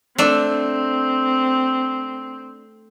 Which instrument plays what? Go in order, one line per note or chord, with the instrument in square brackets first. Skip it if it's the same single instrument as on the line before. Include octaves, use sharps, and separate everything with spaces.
[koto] A3 D4 [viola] C4